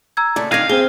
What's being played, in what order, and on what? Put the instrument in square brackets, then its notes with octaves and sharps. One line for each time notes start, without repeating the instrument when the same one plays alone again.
[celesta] A#5 E6 G#6
[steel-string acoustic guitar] A#2 C#3 A3 [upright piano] D5
[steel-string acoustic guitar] D#3 D4 [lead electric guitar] F5 [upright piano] F6 G#6 A#6 [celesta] D#7
[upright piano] C4 G7 [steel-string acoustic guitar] G#4